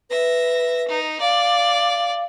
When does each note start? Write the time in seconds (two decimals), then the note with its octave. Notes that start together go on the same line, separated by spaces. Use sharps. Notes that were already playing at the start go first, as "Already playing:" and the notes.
0.10 B4 E5 A#6
0.88 D#4
1.21 D5 F5